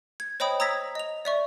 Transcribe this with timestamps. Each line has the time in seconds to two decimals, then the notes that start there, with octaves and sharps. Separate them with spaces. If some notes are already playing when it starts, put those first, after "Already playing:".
0.20 G#6
0.40 C5 C#5 D#5 G5 B5 D#6
0.60 A#5 D#6 E6 G#6 A#6 B6
0.95 D#5 F7
1.25 D5 E5 C#6